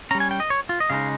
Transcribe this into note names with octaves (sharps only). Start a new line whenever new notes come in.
G3 C#4 A#5
G#5
G5
D#5
C#5
F4
D#5
C#3 G#3 D#4 F5